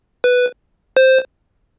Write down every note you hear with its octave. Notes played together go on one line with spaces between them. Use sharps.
B4
C5